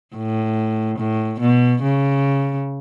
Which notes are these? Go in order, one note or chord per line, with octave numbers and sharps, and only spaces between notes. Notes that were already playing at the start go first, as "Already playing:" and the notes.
A2
A2
B2
C#3